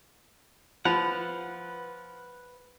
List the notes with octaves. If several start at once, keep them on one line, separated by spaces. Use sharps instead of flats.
F3 B4 F#5 B5